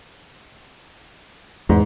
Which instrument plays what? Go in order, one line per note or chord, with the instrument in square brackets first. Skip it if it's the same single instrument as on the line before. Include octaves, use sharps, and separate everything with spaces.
[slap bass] E2 [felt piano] G#2